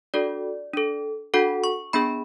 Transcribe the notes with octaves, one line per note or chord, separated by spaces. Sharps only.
D4 F#4 A4 D5
D4 A4
D4 F#4 A4 F#5
C#6
B3 D4 G#4 B5